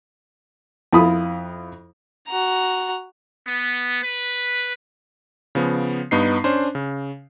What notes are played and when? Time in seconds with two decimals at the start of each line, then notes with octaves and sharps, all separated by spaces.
0.93 F2 E4 F4 B5 D#6
2.28 F#4 A#5
3.46 B3
4.01 B4
5.55 C#3 F3 B3
6.11 G2 B3 D#4 C7
6.44 C#4 D4 C5
6.75 C#3